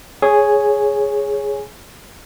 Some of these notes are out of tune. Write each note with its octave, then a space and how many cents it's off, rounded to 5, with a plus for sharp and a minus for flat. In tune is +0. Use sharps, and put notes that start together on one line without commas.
G#4 +0 C#5 +0 G#5 +0